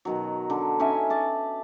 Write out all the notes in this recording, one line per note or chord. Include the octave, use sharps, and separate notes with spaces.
B2 D#3 F#3
D3
C#4 D#4 E5 G#5
D5 A5